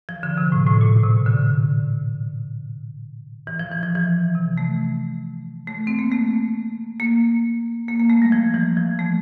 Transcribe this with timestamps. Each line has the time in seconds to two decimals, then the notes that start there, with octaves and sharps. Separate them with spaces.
0.09 F3
0.23 D3
0.38 C3
0.52 A2
0.67 A2
0.81 A#2
1.03 C3
1.26 D3
3.47 E3
3.59 F3
3.72 E3
3.83 F3
3.95 E3
4.35 C3
4.58 A3
5.68 A3
5.87 C4
5.99 A#3
6.11 A3
7.00 A#3
7.89 A#3
8.00 A#3
8.10 A3
8.22 G3
8.32 F3
8.54 E3
8.77 F3
8.99 A3